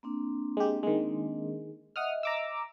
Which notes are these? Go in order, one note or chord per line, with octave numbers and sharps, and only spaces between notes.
A#3 C4 D4
G#3 G4
D#3 G#3
D#5 E5 F#5 D#6 F6
A#5 D6 E6